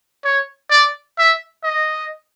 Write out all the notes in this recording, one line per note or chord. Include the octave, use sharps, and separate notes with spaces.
C#5
D5
E5
D#5